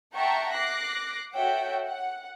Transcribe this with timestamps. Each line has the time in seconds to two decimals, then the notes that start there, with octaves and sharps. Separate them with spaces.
0.14 E5 F#5 G5 A5 A#5 C#6
0.55 D6 F#6 A#6 C7
1.34 F#4 A4 C#5 E5 F#5 G5
1.84 F#5